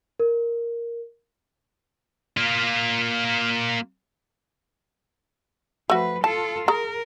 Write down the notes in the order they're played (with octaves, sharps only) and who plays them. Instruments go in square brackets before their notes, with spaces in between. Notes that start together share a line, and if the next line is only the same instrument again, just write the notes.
[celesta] A#4
[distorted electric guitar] A#3 F4
[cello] F3 B4 [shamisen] A3 F#4
[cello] F4 A4 [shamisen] A5
[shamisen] G#4 A#5 [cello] A#4